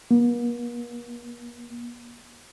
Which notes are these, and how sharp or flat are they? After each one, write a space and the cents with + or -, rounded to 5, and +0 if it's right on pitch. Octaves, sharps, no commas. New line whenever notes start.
A#3 +45